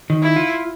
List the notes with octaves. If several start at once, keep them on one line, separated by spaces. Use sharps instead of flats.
D#3
E4
F4